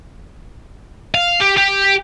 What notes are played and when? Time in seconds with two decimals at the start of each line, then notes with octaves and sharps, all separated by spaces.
1.15 F5
1.41 G4
1.58 G4